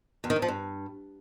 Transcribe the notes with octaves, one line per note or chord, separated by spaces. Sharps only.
E2
D#3
G#2
F3
G2